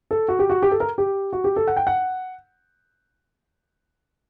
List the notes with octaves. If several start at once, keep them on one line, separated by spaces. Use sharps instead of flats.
A4
F#4
G4
F#4
G4
A4
A#4
G4
F#4
G4
A4
F#5
G5
F#5